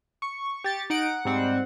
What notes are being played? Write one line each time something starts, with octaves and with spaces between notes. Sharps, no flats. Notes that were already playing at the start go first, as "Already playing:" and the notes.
C#6
G4 A6 C#7
D#4 F#5 D7
F#5
G#2 G3 C4 F#5